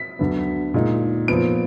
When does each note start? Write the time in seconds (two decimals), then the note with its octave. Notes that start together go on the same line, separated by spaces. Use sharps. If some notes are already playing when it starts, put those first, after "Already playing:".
Already playing: B6
0.19 D2 D3 F#3 B3
0.74 A#2 G#3 D#4
1.28 A#2 F3 B3 D7